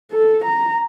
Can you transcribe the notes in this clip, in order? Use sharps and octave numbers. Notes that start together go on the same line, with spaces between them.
A4
A#5